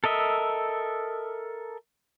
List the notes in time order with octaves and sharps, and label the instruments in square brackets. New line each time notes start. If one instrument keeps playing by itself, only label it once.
[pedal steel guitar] A4 A#4 D#5 E5